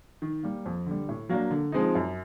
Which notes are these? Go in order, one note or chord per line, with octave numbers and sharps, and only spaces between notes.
D#3
G3 A#3
F2
D3 G3
A2
F#3 A#3 D4
D3
F3 G#3 C4 D#4
F#2